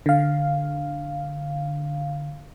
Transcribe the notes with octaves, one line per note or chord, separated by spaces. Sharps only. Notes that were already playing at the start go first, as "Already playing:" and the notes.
D3 F5